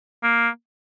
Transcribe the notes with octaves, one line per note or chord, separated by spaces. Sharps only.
A#3